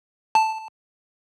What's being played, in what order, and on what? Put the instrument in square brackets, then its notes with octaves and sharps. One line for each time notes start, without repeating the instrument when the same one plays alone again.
[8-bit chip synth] A5